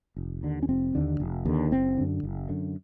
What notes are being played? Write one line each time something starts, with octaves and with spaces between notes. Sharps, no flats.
F1
D#2 D3
C#4
F1 C4
D#2 D3
F1
D#2 D3
F#1 C4
F#2 D3
F#1
F#2 D3